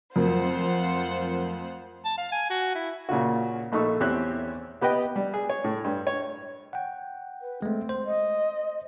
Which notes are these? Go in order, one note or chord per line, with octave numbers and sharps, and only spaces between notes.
F2 F#3 A3 F4 A#4 C5 F#5
A5
F5
G#5
F#4
E4
A#2 C#3 F4 F#4
A#1 A3 D#4 C#6 E6
E2 C4 G4 C#5 E5 F#6
B3 G4 B4 D#5 G5
G3
G#4
C#5
A2
G2
C#5
F#5 G5
B4
G#3 A3 C4
C5
D#5